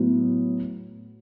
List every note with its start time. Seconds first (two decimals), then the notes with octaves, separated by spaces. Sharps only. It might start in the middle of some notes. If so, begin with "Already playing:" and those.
Already playing: A2 F#3 B3 E4